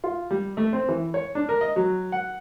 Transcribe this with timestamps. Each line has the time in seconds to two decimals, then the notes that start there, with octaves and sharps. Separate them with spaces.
0.04 F4
0.31 G3
0.57 A3
0.73 C4
0.89 E3
1.14 C#5
1.35 D4
1.49 A#4
1.61 D#5
1.76 F#3
2.12 F#5